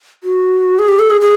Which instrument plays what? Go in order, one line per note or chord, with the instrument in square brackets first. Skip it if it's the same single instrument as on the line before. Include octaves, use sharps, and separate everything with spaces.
[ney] F#4
G#4
G4
A4
G#4
G#4